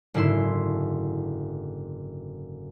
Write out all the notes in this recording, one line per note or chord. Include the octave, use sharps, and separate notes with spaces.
F#1 G#2 D3 E4 C6 E7